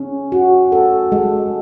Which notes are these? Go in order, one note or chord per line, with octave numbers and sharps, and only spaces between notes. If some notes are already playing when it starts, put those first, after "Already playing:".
Already playing: C#4
F#4
A4
G#3